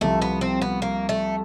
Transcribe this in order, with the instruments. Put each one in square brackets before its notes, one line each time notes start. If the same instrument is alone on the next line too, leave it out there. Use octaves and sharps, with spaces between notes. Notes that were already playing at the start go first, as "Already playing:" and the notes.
[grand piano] C2 C3 F3 [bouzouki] A3
[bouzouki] B3
C4
B3
A#3
A3